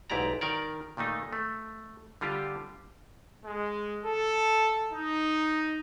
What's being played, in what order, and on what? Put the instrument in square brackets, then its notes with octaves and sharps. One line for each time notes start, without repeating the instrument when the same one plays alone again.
[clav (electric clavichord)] B1 G#2 E4 G4 D5 A#5
D#3 A#4 D5
A#2 D#3 A3 D#4
A3
D3 G3 F4 G4
[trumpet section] G#3
A4
D#4